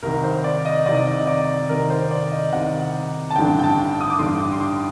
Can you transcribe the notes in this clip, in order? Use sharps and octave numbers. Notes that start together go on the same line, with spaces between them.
C2 C3 D#3 A#4
C5
D5
D#5
C2 C3 D#3 D5
D#5
D5
D5
C2 C3 D#3 A#4
C5
D5
D#5
C2 C3 D#3 F#5
A5
A1 G2 D3 G5
G5
A5
D#6
D6
A1 G2 D3 C6
D6
C6
D6